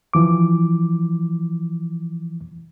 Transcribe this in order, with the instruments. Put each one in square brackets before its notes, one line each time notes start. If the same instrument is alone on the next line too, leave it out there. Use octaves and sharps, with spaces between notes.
[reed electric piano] E3 F3 D6